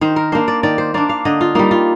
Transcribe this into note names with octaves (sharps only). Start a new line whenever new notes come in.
D#3 C5
A#4
A#3 D4 C5
D5
D#3 D5
C5
A#3 D4 D5
F5
D3 D#5
F4
G3 A#3 D#4
F4